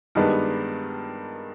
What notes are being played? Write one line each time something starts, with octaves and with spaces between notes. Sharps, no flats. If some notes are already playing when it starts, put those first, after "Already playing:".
G2 D#3 G#3 B3 D4